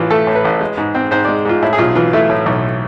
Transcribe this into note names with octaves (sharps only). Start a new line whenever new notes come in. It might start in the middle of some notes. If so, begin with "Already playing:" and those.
Already playing: A1 A2 E3 F4
A3 A4
A2
B4
A1
G#3
G#2
C4
G#2 C5
G#3 D5
G#2 F4
A2 E4
G#4
B1 F4
E3 F4
A3 E4
A2
B1